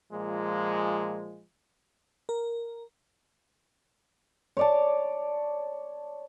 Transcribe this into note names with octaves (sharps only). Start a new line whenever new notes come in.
A#2 F3 G#3
A#4
C#5 D5 A5